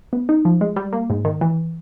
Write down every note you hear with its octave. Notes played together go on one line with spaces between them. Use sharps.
B3
D#4
F3
G#3
G3
A#3
G#2
D#3
E3